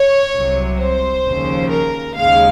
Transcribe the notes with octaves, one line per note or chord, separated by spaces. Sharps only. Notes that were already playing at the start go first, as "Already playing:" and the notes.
Already playing: C#5
C2 C3 F#3
C5
D#2 C#3 F3
A#4
D#2 C#3 G#3 F5